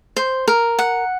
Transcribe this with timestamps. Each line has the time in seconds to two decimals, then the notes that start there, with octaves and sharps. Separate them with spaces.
0.16 C5
0.48 A#4
0.79 F#5